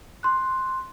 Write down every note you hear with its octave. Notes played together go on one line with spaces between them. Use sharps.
C6 F#6